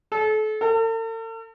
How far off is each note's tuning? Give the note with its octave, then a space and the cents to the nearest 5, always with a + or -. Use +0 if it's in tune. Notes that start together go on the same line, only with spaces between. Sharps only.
A4 -35
A4 +45